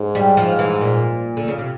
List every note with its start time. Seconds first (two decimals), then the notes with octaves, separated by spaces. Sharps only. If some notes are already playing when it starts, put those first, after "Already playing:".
Already playing: G#2
0.15 G3
0.37 F3
0.59 E3
0.81 A#2
1.37 D3
1.48 C#3
1.58 C3